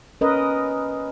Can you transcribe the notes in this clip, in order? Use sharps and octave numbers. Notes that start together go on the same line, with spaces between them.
C#4 A#4 B4 D#5